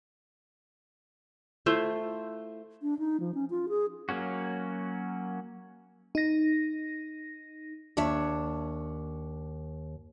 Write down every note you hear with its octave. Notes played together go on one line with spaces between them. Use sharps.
A3 E4 F4 C5
D4
D#4
F3
C#4
F4
G#4
F#3 A#3 C#4 F#4
D#4 A#6
D#2 D4 C#5 E5